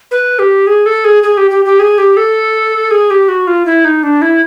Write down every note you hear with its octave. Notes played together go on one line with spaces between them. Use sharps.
B4
G4
G#4
A4
G#4
G#4
G4
G4
G4
G#4
G4
A4
G#4
G4
F#4
F4
E4
D#4
D4
E4